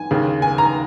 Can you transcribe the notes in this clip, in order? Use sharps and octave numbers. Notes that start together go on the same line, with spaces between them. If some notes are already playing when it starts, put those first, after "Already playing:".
Already playing: G#5
D#2 C#3
G#5
A#5